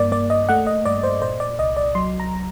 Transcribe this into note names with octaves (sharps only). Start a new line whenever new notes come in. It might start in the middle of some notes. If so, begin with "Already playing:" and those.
Already playing: G2 A#3 D5
A#3 D5
D#5
A3 F#5
D#5
G2 D5
C5
A#2 C5
D5
C2 D#5
D5
F#3 C6
A#5